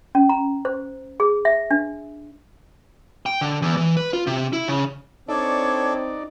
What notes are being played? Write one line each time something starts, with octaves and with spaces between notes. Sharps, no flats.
C#4
A#5
C5
G#4
E5
D4
G5
D3
E2
E3
B4
F4
C3
E4
C#3
C4 D4 D#4 A4 C#5 D5